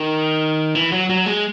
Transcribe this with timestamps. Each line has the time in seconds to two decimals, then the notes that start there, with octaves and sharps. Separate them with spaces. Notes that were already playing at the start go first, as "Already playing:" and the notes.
Already playing: D#3
0.75 E3
0.92 F#3
1.10 F#3
1.26 G#3